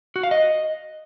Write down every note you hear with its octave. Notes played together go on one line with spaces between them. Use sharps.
F#4
F5
D#5